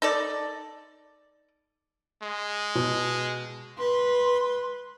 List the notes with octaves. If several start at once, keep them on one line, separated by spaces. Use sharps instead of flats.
D#4 A4 D5
G#3
B2
B4 C6